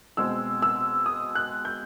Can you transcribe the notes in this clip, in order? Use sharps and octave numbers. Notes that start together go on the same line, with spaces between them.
B2 G#3 C4 E6
E6
D#6
F#6
G6